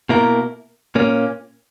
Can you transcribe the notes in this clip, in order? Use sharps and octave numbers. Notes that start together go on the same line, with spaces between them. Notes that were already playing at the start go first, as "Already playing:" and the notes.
B2 A#3 E4 A#4
A#2 A#3 C#4